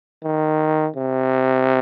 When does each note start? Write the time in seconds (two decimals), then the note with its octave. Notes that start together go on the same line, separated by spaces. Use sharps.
0.23 D#3
0.96 C3